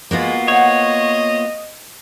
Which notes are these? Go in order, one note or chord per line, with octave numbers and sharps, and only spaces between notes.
G#3 A#3 B3 F4 F#4
C5 C#5 D#5 F#5